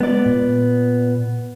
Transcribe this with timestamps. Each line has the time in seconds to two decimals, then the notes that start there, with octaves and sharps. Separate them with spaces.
0.01 G#3 B3 D5
0.26 A#2